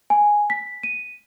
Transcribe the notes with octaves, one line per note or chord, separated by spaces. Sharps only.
G#5
B6
D#7